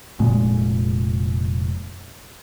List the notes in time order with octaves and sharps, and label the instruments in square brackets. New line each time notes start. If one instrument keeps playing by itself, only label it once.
[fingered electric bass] F1 A#2 G#3